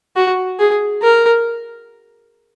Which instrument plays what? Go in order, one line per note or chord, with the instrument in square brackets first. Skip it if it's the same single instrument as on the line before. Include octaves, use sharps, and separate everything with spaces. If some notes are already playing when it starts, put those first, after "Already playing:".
[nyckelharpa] F#4
G#4
A#4